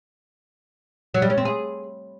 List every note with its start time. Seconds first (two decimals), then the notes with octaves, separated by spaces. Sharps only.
1.14 F#3
1.22 G3
1.30 C#4
1.38 C4
1.45 G#4